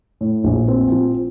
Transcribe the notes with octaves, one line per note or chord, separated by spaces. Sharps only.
A2
A#1
C4
F3